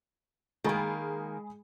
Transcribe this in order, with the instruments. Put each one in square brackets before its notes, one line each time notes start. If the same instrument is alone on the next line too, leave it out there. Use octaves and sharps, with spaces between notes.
[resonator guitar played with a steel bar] D#3 A#3 [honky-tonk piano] G#3 G#4 B5